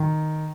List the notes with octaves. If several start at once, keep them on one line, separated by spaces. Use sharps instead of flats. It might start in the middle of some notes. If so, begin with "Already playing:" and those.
Already playing: D#3